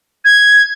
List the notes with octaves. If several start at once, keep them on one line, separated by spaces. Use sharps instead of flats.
G#6